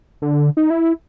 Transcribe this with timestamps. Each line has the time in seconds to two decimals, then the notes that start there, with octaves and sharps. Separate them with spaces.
0.22 D3
0.57 D#4
0.70 E4